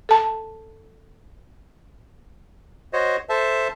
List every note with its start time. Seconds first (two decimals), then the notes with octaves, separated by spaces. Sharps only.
0.09 A4 A5
2.93 F#4 C5 C#5 D#5
3.29 A4 C5 E5 A5